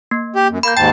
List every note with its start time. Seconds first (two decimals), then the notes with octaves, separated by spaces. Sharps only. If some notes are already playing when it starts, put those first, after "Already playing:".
0.11 A#3
0.36 G4
0.50 F#2
0.63 A#3 B5 G6
0.77 D#2 G#2 G5 A5